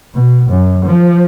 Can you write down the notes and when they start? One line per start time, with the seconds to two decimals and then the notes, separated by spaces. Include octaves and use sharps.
0.15 B2
0.50 F#2
0.86 F3